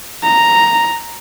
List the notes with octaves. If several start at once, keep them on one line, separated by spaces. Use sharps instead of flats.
A#5